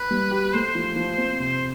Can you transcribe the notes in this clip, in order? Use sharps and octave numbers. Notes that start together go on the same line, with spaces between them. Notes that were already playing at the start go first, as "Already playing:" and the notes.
Already playing: B4
G3
G4
A3 C5
F3
F3
C4
C3 C5